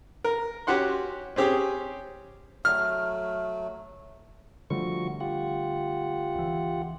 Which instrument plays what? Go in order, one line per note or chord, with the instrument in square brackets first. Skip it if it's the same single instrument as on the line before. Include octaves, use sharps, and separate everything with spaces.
[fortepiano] A#4
C#4 F#4 G4 F#5 C6
C4 C#4 G4 G#4
[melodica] F#3 A3 [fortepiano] F6
[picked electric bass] D3 G3 A3 [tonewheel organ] F3 F#4 C#6
[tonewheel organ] F4 G4 F#5
[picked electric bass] C#2 E3